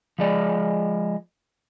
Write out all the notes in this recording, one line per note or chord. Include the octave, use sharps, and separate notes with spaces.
F3 G#3 D5